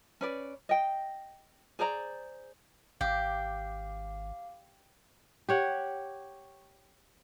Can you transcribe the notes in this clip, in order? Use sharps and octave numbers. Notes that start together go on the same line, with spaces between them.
C#4 B4 D5
D#5 G5
G#4 C5 D5 A#5
G#1 G4 F5 D6
G4 C#5 F#5